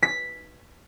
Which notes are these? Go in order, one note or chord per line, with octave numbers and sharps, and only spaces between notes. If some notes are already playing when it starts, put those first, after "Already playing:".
B6